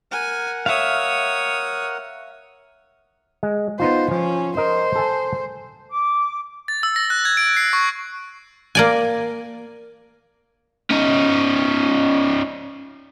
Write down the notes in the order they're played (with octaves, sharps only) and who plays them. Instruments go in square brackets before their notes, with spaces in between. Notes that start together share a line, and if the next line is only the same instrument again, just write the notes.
[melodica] A#4 F#5 [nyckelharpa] G#5
[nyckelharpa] C#5 D#6 [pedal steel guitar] E5 F5
[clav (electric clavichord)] G#3
[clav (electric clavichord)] B3 D#4 F4 [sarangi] C5
[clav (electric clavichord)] F3 [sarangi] C#4
[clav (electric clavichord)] A#4 D#5 [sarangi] C5
[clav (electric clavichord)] A4 G#5 A5
[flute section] D6
[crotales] A6
E6
A#6
F#6
G#6
D7
C7
C#6
[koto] A#3 D5 G#5
[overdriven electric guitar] C#4 D#4